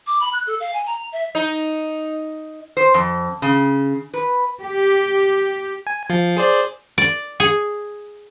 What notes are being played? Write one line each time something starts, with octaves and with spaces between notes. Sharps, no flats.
D6
B5
F#6
A4
F5
G#5
A#5
E5
D#4
C5
F2
C#3
B4
G4
G#5
F3 F4
G#4 C5 D5
D5
G#4